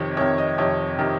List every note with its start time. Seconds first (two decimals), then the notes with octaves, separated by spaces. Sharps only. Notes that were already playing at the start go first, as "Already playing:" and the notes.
Already playing: F2 C3 D#3 C#5
0.17 F2 C3 D#3 C#5
0.38 D#5
0.58 F2 C3 D#3 C#5
0.99 C3 D#3